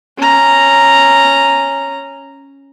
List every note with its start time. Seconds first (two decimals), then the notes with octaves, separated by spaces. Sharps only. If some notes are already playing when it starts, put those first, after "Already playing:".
0.18 C#4 A#5